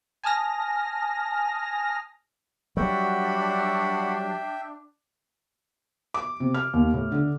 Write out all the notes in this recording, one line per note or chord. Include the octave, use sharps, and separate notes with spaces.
G#5 A5 D#6 F6 A#6
F#3 G3 D4 F#4 E5 F#5 G5 B5
D6
C3
F6
D#2
A2
D3